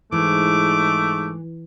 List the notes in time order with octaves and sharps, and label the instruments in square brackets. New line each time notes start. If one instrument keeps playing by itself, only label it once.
[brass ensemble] G#2 [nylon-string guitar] E3 [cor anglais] A3 [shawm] D6